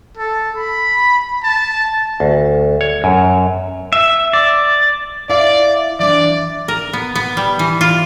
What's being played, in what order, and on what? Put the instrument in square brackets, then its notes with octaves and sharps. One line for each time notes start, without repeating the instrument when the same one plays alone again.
[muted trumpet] A4
B5
A5
[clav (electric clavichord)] D2
C#5
F#2
[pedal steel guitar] E5
D5
[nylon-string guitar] E4 F5 [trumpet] D5
[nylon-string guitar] E3 D4 [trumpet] D5
[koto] A#4
B3
B3
G3
E3
F4